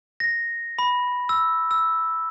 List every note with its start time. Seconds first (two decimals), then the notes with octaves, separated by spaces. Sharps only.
0.20 A#6
0.79 B5
1.29 E6
1.71 E6